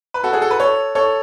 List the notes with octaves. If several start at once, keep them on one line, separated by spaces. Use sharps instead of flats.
B4
F#4 A4
G#4
A4
B4
A4 C#5
A4 C#5